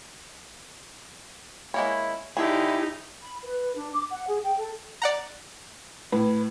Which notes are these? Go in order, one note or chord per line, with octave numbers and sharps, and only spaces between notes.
G#3 A#3 C#4 E4
D3 C#4 D#4 E4 G4 G#4
B5
B4
D4
D6
F#5
G#4
G5
A4
D5 F#5 A#5
A2 B4